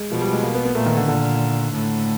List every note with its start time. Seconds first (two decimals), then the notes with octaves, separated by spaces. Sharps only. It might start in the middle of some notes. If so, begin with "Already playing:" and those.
Already playing: G#3
0.11 B2 F3
0.21 G3
0.33 G#3
0.43 A#3
0.54 B3
0.65 B3
0.75 A#2 A3
0.86 D#3
0.97 D3
1.08 A#2 D3
1.72 A2